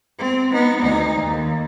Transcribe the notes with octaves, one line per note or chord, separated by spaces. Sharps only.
C4
B3 D#4
D2 D#4
D#2